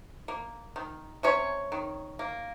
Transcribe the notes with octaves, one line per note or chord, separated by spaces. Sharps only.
A#3
D#3
C3 C#4 C#5
D#3
A#3